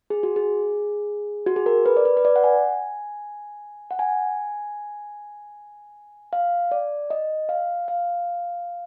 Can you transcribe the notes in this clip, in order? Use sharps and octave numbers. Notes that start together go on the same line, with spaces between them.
G#4
F#4
G#4
F#4
G#4
A#4
B4
D5
B4
B4
D5
F#5
G#5
F#5
G#5
F5
D5
D#5
F5
F5